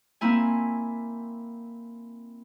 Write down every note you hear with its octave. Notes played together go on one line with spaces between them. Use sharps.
A#3 C4 E4 G#5